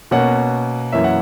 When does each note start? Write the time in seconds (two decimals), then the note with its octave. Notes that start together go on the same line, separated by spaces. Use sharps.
0.11 B2 A#3 C#4 F#5
0.92 F#2 E3 A#3 C#4 E5
1.04 F#5